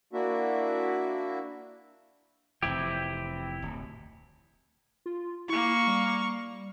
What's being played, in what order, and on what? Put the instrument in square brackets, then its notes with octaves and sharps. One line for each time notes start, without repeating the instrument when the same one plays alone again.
[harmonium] A#3 D4 E4 F#4 E5
[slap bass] F1 E3 [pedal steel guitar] C4 E4 G4
[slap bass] D1
[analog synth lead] F4
[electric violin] A#3 C#6 [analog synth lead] E4
[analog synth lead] G3